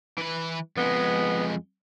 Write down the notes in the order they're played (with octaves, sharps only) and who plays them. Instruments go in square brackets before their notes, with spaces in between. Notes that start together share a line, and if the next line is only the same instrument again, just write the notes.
[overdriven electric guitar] E3 B4
[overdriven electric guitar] F2 G#3 [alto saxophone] B3